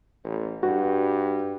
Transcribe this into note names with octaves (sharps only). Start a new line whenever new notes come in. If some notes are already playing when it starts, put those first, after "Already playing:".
A1
G2 F#4